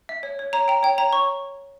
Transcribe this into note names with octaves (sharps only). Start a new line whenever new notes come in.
E5
C#5
C#5
C#5 A#5
G5 A#5
C#5 G5
C#5 A#5
C#5 C#6